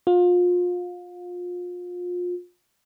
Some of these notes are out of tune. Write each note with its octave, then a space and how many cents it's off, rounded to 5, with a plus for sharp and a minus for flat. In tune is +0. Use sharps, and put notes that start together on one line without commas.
F4 +30